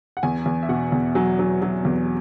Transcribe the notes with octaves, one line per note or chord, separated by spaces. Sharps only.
F#5
E2 G#5
E2
E5
B2 F#5
E2
F#3 G#5
F#3
F#3
E2